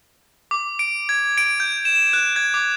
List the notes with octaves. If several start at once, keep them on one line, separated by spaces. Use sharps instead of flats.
D6
D7
G#6
D7
G6
E7
F#6
G#6
D6